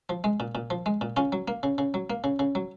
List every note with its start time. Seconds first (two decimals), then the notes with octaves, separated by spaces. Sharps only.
0.09 F3
0.24 G#3
0.40 A#2
0.55 A#2
0.70 F3
0.86 G#3
1.01 A#2
1.16 C#3 C#4 F4
1.32 F#3
1.48 A#3
1.63 C#3
1.78 C#3
1.94 F#3
2.10 A#3
2.24 C#3
2.39 C#3
2.55 F#3